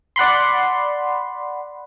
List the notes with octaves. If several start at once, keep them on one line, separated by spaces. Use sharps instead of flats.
D5 F#5 B5 C6